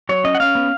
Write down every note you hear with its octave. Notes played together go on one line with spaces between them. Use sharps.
F#3 C#5
C#4 D#5
F#5
C#4 F5
B3